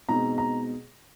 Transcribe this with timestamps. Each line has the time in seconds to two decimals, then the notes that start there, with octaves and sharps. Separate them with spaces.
0.09 B2 G#3 C4 D#4 A#5
0.38 A#5